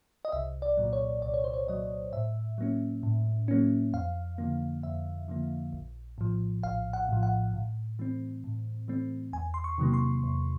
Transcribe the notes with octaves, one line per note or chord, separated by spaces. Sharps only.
D#5
C2 E5
D5
A#2 F#3
C#5
C2 D5
C#5
C5
C#5
A#2 F#3 D#5
A2 E5
F#3 A#3 C#4
A2
F#3 A#3 C#4
F2 F5
D3 F3 A#3
F2 E5
D3 F3 A#3
A#1
A2 F3
A#1 F5
F#5
A2 F3
F#5
A2
E3 A3 C4
A2
E3 A3 C4
E2 G#5
C6
C#6
C3 D#3 F#3 A#3
C6
E2